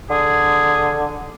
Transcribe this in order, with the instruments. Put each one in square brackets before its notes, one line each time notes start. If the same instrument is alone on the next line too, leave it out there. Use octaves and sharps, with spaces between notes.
[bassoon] D3 [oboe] G#4